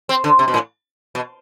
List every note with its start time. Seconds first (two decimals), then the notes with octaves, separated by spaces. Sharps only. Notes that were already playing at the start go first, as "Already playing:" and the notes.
0.09 C4
0.24 D3
0.39 C3
0.48 B2
0.54 A2
1.15 B2